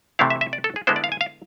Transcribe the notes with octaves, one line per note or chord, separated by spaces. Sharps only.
C3 E3 A3 C4 E4 F5
E5
E5
D5
A4
G#4
D3 G#3 B3 E4 C5
D5
F5
G#5
F5